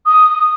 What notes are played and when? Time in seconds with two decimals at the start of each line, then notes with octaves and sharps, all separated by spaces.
0.06 D#6